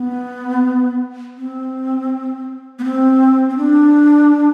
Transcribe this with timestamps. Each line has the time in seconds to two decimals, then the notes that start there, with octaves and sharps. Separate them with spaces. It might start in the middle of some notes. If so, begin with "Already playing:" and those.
Already playing: B3
1.38 C4
2.79 B3
2.84 C4
3.50 C4
3.57 D4